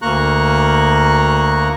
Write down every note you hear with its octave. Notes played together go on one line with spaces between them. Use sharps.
D2 A#3 A#5 C#6 F#6